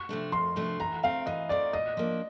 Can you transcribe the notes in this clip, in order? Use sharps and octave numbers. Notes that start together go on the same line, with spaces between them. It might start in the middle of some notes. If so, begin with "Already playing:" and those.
Already playing: C#6
C3 F3 A3 D4
F2 C6
C3 F3 A3 D4
E3 A#5
A3 C4 F5
E3 D#5
A3 C4 D5
A#2 D#5
F3 A#3 D4